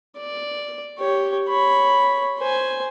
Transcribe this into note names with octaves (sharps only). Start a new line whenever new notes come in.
D5
G4 C#5
C#5 B5
C5 G#5